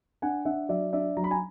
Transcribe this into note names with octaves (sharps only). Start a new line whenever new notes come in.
D4 F#5 G#5
D4 E5 F#5
F#3 D5 E5
D4 D5 E5
F#3 A#5
B5
G#5 A#5